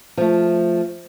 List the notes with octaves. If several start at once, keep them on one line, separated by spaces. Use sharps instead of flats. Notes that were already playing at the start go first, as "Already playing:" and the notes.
F3 A3